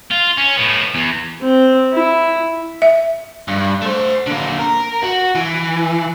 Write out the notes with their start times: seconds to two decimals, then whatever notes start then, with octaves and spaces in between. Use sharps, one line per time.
0.11 F4
0.37 C#4
0.57 A2 B3
0.95 E2
1.42 C4
1.93 E4
2.82 E5
3.48 G2
3.82 A3 C5
4.27 D3 A#3
4.59 A#4
5.02 F#4
5.35 E3